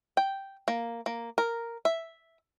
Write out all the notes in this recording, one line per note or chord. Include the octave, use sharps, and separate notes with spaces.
G5
A#3
A#3
A#4
E5